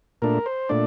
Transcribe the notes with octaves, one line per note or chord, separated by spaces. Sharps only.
A#2 A3 D4 A#4
C5
A#2 A3 D4 D5